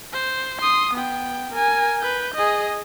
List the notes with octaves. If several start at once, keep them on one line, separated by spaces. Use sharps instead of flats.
C5
C6 D#6
B3 G5
A#4 G#5
B4 G6
G#4 D#5